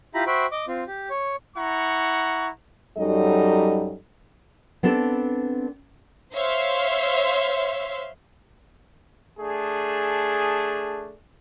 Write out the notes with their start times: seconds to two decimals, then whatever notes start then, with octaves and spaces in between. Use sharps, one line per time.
0.15 E4 F4 G4 A#5 B5
0.27 F#4 C5 E5 G5 B5
0.52 D#5 D6
0.68 C4 F4
0.87 G4
1.10 C#5
1.57 E4 F#5 A#5 C#6
2.98 F#2 F#3 G3 D#4 A4 D#5
4.83 B3 C4 D4 A4
6.35 C5 C#5 E5 F5 C6
9.39 A3 D4 G#4